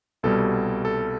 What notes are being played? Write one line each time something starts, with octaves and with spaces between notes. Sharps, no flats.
C2 B2 G3 A4
A4